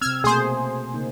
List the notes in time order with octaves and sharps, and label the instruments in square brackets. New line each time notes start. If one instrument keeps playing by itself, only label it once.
[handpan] C3 C4 [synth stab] E6 F6 G#6
[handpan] B2 A3 A#3 [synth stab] G#4 C5
[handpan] C#3 A#3 D#4